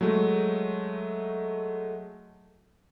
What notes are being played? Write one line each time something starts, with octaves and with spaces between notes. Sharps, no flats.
F#3 G#3 A3